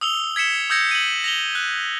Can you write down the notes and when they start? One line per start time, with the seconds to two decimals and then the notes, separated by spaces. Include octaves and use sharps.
0.01 D#6 E6 F7 G7
0.36 G#6 B6 C#7 E7 G7
0.70 D#6 E6 G6 G#6 A#6 C#7
0.91 D#7 F#7
1.24 A#6 F7 G7
1.55 F#6